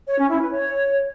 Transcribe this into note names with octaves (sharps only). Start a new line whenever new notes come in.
C#5
C#4
E4
B4
C#5